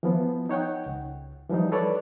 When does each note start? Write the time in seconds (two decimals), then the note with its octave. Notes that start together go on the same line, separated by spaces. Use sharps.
0.03 E3 F3 B3
0.49 D#4 C#5 F#5 G5
0.86 C#2
1.49 E3 F3 G3 D#4
1.72 A4 B4 C#5 D5 A5